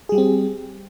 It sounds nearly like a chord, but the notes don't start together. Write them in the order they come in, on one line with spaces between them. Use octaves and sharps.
G#4 G3 G4 C4